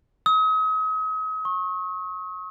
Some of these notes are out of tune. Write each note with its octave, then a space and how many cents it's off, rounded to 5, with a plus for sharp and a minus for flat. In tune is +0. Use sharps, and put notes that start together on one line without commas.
D#6 +40
C#6 -30